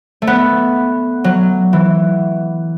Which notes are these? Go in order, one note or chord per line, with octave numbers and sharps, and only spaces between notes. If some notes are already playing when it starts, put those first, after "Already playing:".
A3
B3
F#3
E3